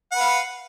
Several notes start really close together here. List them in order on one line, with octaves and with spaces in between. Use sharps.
F#5 B4 F5